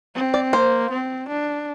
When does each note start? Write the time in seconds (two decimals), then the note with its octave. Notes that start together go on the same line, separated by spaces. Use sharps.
0.15 C4
0.34 D5
0.53 A#3 C5
0.91 C4
1.28 D4